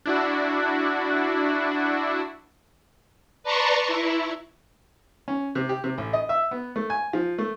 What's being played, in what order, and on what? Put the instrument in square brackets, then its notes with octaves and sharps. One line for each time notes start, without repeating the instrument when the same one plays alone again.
[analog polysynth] D4 E4 F#4
[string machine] B4 D5 A5 A#5 C6 C#6
E4
[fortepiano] C#4
C3
G4
C3
A1
D#5
E5
B3
A3
G#5
F3
A3